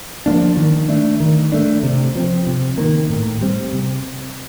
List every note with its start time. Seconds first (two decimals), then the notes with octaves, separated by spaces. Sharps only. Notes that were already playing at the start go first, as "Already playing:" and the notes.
0.26 F3 A#3 D4
0.57 D#3
0.88 A3 D4
1.20 D#3
1.52 A3 D4
1.83 C3
2.15 F3 C4
2.47 C3
2.78 D#3 A#3
3.10 A2
3.41 G3 C4
3.73 C3